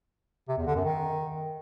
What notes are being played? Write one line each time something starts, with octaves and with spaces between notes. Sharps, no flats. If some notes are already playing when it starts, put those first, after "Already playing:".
C3
E2
D3
F#2
D#3